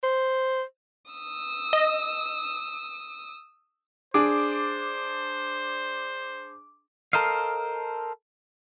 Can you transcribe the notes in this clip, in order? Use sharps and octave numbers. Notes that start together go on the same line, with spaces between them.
C5
D#6 E6
D#5
D4 G#4 C5 D6
A4 A#4 C5 D#5 F5